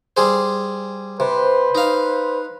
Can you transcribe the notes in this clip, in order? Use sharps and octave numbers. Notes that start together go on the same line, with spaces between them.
G3 G#4 C5
C3 B4 C5
D#4 F5